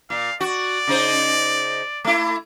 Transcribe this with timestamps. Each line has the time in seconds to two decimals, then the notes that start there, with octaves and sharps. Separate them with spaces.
0.10 A#2 F5
0.40 F#4 D5
0.87 C#3 D#4 C5
2.04 A3 E4